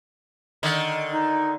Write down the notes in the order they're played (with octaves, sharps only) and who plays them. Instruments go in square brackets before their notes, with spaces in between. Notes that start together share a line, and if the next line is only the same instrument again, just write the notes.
[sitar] D3 D#3
[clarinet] D#4